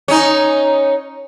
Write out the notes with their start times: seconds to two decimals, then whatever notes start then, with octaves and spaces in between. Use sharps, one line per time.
0.08 C#4 D#4